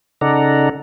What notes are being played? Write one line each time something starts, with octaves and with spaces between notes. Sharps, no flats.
C#3 D#4 A4 D5 F#5 A#5